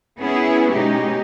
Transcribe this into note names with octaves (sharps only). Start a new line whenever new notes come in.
B3 C#4 E4 G#4
B2 G#3 C#4 D#4 G4